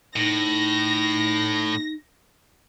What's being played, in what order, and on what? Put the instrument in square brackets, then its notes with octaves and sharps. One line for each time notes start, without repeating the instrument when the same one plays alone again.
[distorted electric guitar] A2 [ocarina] D#4 [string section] A#6